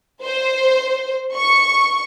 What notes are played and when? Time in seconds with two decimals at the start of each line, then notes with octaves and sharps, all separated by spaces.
0.23 C5
1.36 C#6